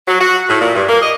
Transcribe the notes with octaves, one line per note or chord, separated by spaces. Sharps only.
F#3
F#4
A2
A#2
G2
A#3
D#5